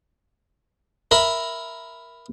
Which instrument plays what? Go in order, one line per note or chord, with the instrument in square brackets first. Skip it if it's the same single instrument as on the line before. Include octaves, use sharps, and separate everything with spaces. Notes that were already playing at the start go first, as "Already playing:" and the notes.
[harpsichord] A#4 E5 B5